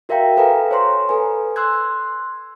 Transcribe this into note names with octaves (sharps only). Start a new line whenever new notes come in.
F#4 A#4 E5 F5 G5 A#5
A4 B4 F5 G#5 A#5
C5 C#5 A#5 C6
A4 B4 G#5
C6 E6 F#6 G#6